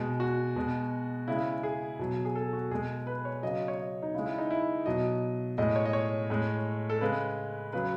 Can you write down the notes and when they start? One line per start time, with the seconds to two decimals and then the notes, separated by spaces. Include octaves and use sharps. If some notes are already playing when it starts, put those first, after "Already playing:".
Already playing: B2 G#3 G#4
0.20 F#4
0.56 B2 G#3
1.28 C#3 G#3 E4
1.63 G#4
1.99 B2 F#3
2.25 G#4
2.36 A4
2.53 F#4
2.71 B2 G#3 G#4
3.07 B4
3.25 C#5
3.43 C#3 F#3 D#5
3.68 C#5
3.79 D#5
4.03 D#4
4.14 C#3 G#3 E4
4.26 E4
4.38 D#4
4.50 E4
4.86 B2 F#3 D#5
5.58 A2 G#3 D#5
5.76 C#5
5.85 D#5
5.93 C#5
6.30 A2 G#3
6.90 A4
7.01 C#3 G#3 B4
7.73 C#3 F#3 B4